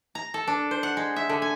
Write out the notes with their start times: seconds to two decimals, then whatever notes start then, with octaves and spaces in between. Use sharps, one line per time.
0.15 A#5
0.34 A4
0.47 D4
0.71 C5
0.83 F#5
0.97 G#3
1.16 E5
1.29 D3
1.42 G#5